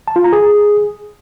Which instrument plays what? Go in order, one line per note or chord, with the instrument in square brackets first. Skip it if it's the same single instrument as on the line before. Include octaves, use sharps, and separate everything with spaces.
[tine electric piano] A5
F4
A#5
G#4